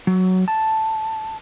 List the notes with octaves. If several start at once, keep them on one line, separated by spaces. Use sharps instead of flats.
F#3
A5